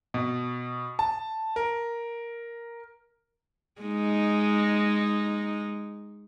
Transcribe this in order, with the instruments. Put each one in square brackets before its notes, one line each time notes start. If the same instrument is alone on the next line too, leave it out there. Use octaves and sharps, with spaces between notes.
[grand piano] B2
A5
A#4
[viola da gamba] G#3 D#4